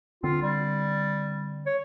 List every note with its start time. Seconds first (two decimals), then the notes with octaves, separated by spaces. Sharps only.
0.24 D3 C4 F4
0.42 G3
1.66 C#5